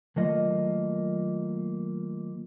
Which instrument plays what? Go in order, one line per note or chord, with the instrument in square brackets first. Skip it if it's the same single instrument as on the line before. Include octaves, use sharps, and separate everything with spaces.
[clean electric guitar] D#3 F#3 A3 A#3 F4 D#5